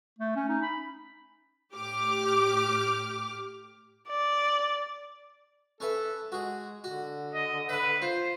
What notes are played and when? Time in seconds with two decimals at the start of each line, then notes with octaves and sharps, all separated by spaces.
0.19 A3
0.36 C#4
0.49 D#4
0.62 B5
1.74 A2 G4 D6 F6
4.08 D5
5.80 C#4 A4 B4 E5
6.32 G#3 F#4 G#4
6.84 D3 F#4
7.34 D#5
7.69 B4 E5 F#5
8.02 F4 C5